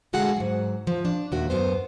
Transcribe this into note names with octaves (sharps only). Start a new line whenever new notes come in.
D3 G#3 F#4 G#4 F5 F#5
G#2 F#3
F3
D4
D#2 A#2 F#4 E5
F#2 B3 C5